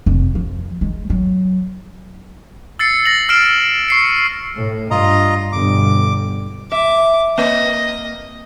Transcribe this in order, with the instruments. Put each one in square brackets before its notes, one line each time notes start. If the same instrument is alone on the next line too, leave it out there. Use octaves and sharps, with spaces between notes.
[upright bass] F1
F3
G#3
F#3
[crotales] E6 A6 C7 C#7
A#6 F#7
E6 F6 C7 D7 E7
C#6 C7 C#7
[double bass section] A2
[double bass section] G2 [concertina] F4 D#5 A#5
[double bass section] G1 G2 B2 [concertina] D6
[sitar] E5 [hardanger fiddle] D6
[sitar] A#3 [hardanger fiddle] D#5